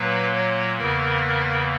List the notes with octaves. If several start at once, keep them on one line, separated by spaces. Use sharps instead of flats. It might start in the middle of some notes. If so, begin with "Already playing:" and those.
Already playing: A#2 F#3 A#3 B4
C#5
E2 C#3 E3 A#3 A#4